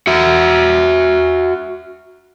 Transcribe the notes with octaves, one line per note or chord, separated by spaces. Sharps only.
F#4 E5